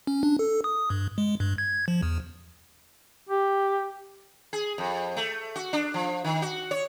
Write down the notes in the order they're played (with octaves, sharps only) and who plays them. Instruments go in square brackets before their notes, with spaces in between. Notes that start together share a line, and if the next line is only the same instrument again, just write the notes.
[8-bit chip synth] C#4
D4
A4
D#6
G2
G#3
G2
G#6
F3
E2
[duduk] G4
[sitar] G#4
F2
A3
F#4
D4
F3
D#3
F#4
C#5